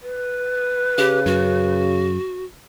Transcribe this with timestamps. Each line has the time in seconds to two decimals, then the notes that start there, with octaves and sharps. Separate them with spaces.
0.03 B4
0.98 C#3 G4
1.26 F#2 F#4